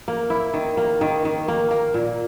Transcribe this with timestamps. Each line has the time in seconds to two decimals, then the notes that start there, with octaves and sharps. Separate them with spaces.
0.08 A#3
0.30 E4
0.54 D#3
0.77 A#3
1.01 D#3
1.25 D#3
1.48 A#3
1.71 A#3
1.94 A#2